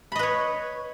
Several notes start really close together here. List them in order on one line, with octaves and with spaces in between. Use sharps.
B5 D#5 B4 C#5